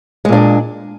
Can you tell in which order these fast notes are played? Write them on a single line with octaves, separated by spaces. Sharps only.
G#3 A#2 D4